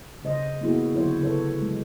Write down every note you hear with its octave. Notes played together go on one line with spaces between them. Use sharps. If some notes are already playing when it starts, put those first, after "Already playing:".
C#3 C#4 C5 D#5
A#3 B3 E4 F#4 G#4
D3 F#3 E4 C5 C#5
C#3 E4 A4 B4 C#5
F#3 G#3